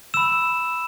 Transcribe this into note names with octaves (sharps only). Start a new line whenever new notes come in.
B5 E6 E7